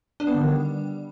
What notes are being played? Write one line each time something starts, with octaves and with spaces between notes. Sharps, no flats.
D4
B3
D3
D#3
G3